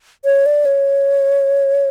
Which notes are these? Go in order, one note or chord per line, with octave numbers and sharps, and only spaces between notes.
C#5
D5
C#5